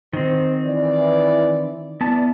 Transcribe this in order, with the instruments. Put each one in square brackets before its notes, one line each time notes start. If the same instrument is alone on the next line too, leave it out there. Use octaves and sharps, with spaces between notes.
[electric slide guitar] D#3 C4 [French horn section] C5
[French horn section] E3 D5
[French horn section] E3 D5 [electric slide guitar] B3 A5